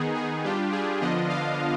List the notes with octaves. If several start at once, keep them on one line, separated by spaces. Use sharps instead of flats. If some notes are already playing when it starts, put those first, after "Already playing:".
Already playing: D#3 B3 D#4 G#4
G#4
G3 D4 F4 G4
G#4
D3 F3 B3 D4 F4 D#5
F5